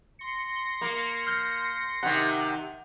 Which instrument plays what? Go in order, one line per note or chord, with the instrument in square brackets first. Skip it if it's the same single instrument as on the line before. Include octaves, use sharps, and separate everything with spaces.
[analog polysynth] C6 A#6 C#7
[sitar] A#3
[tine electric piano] F6 G6
[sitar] C3 D#3 [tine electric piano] F#5